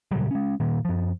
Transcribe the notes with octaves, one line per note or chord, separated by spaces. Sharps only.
A#2 C#3 F#3 G3
G#3 C#4
A#2 D#3 A#3
F#2 F3